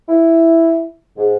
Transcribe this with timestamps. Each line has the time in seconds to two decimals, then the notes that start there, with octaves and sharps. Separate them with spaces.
0.09 E4
1.17 G#2